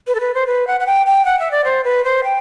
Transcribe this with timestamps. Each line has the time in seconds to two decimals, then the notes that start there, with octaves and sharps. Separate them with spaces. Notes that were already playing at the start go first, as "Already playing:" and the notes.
0.07 B4
0.15 A4
0.20 B4
0.34 C5
0.47 B4
0.67 F#5
0.80 F#5
0.87 G5
1.06 G5
1.25 F#5
1.39 E5
1.51 D5
1.65 C5
1.84 B4
2.04 C5
2.24 G5